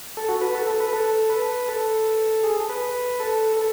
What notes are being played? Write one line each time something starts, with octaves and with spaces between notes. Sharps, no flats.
A4
F#4
B4
A4
A4
B4
A4
B4
A4
G#4
B4
A4
A4